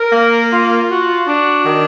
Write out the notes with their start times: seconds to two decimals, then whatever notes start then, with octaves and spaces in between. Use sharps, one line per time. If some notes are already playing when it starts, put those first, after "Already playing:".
Already playing: A#4
0.12 A#3
0.51 F4
0.90 F#4
1.27 D4
1.66 D#3